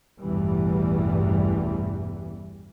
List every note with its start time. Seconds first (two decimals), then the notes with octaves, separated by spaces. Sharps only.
0.22 A1 E2 G2 B2 E3 G3